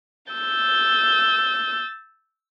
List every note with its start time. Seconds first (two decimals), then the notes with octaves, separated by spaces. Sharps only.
0.32 E6 G6 A6